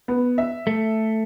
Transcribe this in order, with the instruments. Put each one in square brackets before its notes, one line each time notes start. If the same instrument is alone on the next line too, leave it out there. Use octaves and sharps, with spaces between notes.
[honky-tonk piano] B3
E5
[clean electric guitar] A3